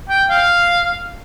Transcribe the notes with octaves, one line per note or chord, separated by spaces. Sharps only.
G5
F5